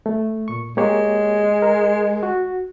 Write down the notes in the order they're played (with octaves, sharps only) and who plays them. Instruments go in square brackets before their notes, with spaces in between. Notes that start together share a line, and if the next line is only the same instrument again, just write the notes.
[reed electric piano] A3
A#2 C#6
[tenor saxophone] G#3 [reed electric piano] A#3 G4 C#5
[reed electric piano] A#4
F#4